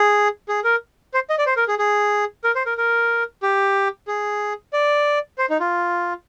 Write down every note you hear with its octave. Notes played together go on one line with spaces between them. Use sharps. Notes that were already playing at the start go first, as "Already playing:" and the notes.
Already playing: G#4
G#4
A#4
C5
D#5
D5
C5
A#4
G#4
G#4
A#4
C5
A#4
A#4
G4
G#4
D5
C5
D#4
F4